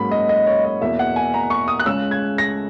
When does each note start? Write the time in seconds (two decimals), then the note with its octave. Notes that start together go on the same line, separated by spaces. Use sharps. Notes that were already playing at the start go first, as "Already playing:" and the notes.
Already playing: G#2 F#3 A#3 C#4 B5
0.11 D#5
0.29 D#5
0.47 C#5
0.64 D#5
0.81 E2 B2 A#3 E5
0.99 F#5
1.16 G#5
1.34 A#5
1.50 C#6
1.68 D#6
1.79 F#6
1.86 C#2 C#3 G#3 C#4 E6
2.11 G#6
2.38 A#6